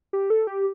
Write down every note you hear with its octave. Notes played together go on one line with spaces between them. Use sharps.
G4
A4
G4